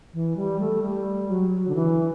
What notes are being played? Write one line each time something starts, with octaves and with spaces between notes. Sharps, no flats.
E3
G3
A3
G3
F#3
D3
E3